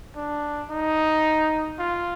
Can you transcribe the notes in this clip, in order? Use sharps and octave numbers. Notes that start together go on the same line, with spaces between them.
D4
D#4
F4